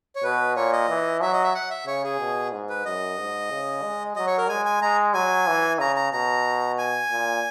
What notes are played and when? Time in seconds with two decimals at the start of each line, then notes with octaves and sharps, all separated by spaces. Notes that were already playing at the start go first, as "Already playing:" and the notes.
0.15 C#5
0.23 B2 B4
0.56 A#2 C#5
0.73 D#5
0.89 E3
1.21 F#3 E5
1.33 D#5
1.43 E5
1.55 F#5
1.70 E5
1.87 C#3 C#5
2.04 G#4
2.20 B2
2.52 G#2
2.69 B4
2.85 F#2 D#5
3.19 G#2
3.51 C#3
3.83 G#3
4.16 F#3 D#5
4.27 C#5
4.38 A#4
4.49 G#3 G#5
4.65 G#5
4.82 G#3 A#5
5.14 F#3 G#5
5.47 E3
5.79 C#3 A#5
5.96 A#5
6.13 B2 A#5
6.78 G#5
7.11 A#2